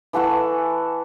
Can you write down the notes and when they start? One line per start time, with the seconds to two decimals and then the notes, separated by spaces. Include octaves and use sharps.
0.13 E3 A4 F#5 C#6